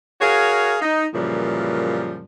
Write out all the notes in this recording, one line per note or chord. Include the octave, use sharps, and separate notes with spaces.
F#4 G#4 A#4 C#5 F5
D#4
F#2 A#2 C#3 E3 F3 G3